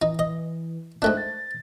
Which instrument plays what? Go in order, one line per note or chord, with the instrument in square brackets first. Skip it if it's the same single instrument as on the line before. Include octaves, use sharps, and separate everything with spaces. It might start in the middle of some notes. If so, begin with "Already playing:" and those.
[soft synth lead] E3 [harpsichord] D#4
[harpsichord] D#5
[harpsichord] G#2 A3 D4 [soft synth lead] F#6
[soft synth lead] A6